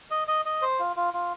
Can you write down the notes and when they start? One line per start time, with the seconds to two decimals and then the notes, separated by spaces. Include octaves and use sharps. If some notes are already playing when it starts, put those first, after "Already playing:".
0.11 D#5
0.28 D#5
0.45 D#5
0.62 C5
0.79 F4
0.96 F4
1.14 F4